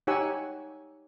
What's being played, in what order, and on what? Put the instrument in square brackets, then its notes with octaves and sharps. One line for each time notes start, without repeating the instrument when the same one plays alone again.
[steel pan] D#4 G4 C#5 F#5 G#5 E6